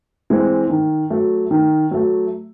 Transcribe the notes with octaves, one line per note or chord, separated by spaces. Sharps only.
E3 G#3 C4
D#3
F#3 A3
D#3
F#3 A3